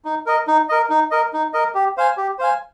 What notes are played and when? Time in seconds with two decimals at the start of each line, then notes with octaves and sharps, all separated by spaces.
0.05 D#4
0.26 A#4 D#5
0.47 D#4
0.69 A#4 D#5
0.90 D#4
1.11 A#4 D#5
1.33 D#4
1.54 A#4 D#5
1.75 G4
1.97 C5 F5 G#5
2.17 G4
2.39 C5 F5 G#5